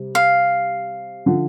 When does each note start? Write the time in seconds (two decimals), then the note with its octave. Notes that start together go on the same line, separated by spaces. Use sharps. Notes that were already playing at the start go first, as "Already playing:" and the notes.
Already playing: C3 G3
0.15 F5
1.26 D3 F3